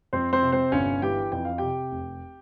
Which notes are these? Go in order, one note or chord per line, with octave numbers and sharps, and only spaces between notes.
F2 C4 C5
C4 C5
C3
C4 C5
G1 C#4 C#5
E3 G4 G5
F2 G5
F5
C3 G4 G5
F1